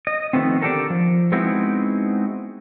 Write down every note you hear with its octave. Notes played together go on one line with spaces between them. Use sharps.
D#5
D#3 F3 A3 B3 C4
D3 D4 E4 G4 A4 A#4
F3
G#3 B3 C4 D#4 E4 F#4